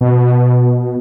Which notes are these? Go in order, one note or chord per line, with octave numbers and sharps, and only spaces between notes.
B2